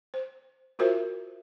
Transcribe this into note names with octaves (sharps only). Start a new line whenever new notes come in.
C5
F4 F#4 A#4 C5 E5